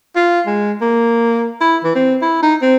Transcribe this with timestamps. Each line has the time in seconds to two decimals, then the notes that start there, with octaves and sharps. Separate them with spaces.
0.16 F4
0.47 G#3
0.81 A#3
1.61 E4
1.84 E3
1.95 C4
2.22 E4
2.43 D#4
2.62 C4